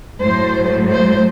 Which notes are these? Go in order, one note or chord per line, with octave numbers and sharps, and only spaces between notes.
A2 F#3 A3 C5
C5